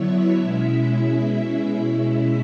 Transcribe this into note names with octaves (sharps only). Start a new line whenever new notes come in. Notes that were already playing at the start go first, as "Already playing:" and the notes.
Already playing: D3 F#3 B3 E4 C#5 E5
B2 G#3 C#4 E4